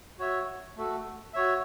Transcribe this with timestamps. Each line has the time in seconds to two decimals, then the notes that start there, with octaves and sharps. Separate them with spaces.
0.19 F#4 C#5 E5
0.76 A3 F#4 A4
1.33 F#4 C#5 E5